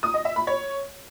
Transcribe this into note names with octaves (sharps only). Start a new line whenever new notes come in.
D#6
D#5
E5
B5
C#5